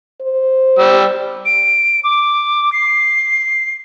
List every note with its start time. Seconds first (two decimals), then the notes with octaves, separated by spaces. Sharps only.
0.21 C5
0.79 G3 E6
1.46 D7
2.04 D6
2.73 C7